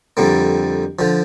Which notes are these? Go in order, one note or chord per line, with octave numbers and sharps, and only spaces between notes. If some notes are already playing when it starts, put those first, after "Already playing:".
F2 D3 G3 A#3
D3 F3